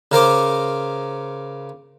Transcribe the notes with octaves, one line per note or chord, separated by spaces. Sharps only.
C#3 A#4 C5 D6